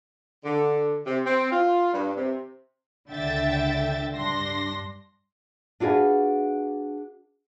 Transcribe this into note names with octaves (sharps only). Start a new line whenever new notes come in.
D3
C3
C4
F4
G2
C3
C#2 D3 E5 G5 A6
G2 D4 C6 A#6
D4 F4 F#4 G#4 B4